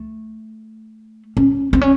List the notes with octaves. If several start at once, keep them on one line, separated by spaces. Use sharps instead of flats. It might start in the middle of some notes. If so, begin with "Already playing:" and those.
Already playing: A3
C#4
C4
C#4